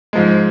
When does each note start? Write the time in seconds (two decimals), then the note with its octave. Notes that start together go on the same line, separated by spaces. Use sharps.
0.13 G#2 F3 G#3